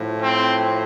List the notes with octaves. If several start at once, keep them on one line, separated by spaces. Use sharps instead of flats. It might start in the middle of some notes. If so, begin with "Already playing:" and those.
Already playing: A2 F3
C4